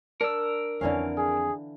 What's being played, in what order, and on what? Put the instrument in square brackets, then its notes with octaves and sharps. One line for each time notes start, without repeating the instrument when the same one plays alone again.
[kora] D4 [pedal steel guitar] A#4 E6
[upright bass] F2 C4 [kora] D3 E3 F5 [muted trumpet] C#4
[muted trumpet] G#4